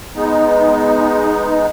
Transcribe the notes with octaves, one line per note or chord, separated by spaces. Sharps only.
G#3 B3 D#4